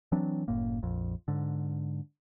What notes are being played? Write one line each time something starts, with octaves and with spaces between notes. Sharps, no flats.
E3 F#3 C4 D4
F#1 F#2 A2 A#3
A#1 F2
G#2 D3